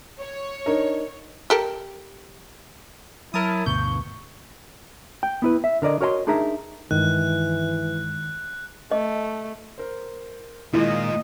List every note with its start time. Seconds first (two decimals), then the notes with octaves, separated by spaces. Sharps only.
0.19 C#5
0.66 D4 D#4 A#4
1.50 G4 A4 A#4
3.34 F#3 E4 A#4 A5 D#6
3.66 D2 G2 B2 C#6 G6
5.23 G5
5.42 B3 E4 B4
5.64 E5
5.82 D3 A#4 D5 D#5
6.01 F#4 A#4 C#5 D#5 G5 C6
6.27 D4 D#4 G#4 A#4 E5 A#5
6.91 G2 D#3 E3 G#3 F#6
8.92 A3 D#5
9.78 A#4 C5
10.74 A#2 D#3 G#3 A#3 E4 F4 D#5